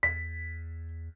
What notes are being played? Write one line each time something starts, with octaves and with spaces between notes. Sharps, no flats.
E2 B6